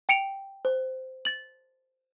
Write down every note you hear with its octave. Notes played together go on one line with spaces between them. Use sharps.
G5 C#7 D7 F7
C5
A6 F#7